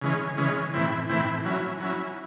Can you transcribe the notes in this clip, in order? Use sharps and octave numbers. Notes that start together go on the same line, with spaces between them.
C#3 E3 G#3 C#4
C#3 E3 G#3 C#4
A2 E3 C4 E4
A2 E3 C4 E4
F#3 C#4 E4
F#3 C#4 E4